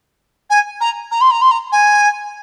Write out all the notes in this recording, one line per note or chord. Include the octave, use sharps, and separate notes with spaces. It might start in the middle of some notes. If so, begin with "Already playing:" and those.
G#5
A#5
A#5
C6
A#5
C6
A#5
G#5